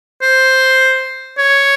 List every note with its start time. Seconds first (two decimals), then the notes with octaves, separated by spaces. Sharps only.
0.22 C5
1.38 C#5